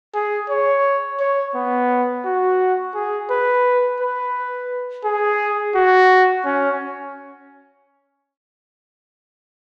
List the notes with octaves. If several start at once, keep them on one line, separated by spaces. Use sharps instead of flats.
G#4
C#5
C#5
B3
F#4
G#4
B4
B4
G#4
F#4
C#4